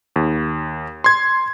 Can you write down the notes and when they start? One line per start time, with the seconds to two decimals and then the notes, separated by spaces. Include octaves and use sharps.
0.16 D#2
1.04 C6 G#6